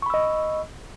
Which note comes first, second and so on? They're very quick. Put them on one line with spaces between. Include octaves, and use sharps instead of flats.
C#6 B5 E6 D#5